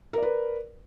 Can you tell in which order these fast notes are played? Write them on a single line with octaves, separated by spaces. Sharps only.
A#4 D5 B4